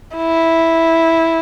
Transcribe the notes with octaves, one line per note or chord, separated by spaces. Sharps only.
E4